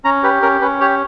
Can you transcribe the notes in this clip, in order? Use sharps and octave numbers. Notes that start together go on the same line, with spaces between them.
C#4 A#5
G4 B4
C#4 A#4
C#4 B4
G4 C#5